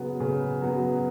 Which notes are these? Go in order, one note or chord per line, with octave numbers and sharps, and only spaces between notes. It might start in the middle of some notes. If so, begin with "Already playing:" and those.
Already playing: C#3 F#3 B3
C#3
F#3 B3